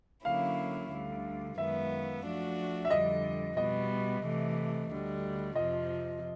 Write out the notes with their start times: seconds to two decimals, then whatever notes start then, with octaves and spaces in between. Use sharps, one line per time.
0.24 D3 F#3 A#3 C#4 E4 F5
0.91 D2 D3 G3
1.58 F#2 D#3 G#3 B3 E5
2.24 F3 A3 D4 F#4
2.85 E5
2.90 F2 D3 G3 D#5
3.57 B2 G3 B3 D#5
4.24 C3 E3 A3
4.90 D2 D3 G3
5.55 F2 C3 F3 D#5